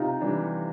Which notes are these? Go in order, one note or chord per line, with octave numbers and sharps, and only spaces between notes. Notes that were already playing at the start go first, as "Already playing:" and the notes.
Already playing: C3 D#4 F4
E3 G3 D4